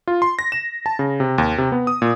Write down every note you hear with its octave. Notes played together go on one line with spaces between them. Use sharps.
F4
C6
A#6
E7
A5
C#3
C3
D#2
C3
B3
D#6
A#2